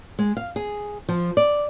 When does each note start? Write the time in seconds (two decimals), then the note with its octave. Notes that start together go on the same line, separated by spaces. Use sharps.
0.19 G#3
0.37 F5
0.56 G#4
1.09 F3
1.37 D5